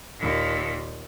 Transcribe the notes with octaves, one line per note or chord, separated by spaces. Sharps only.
D#2 A#2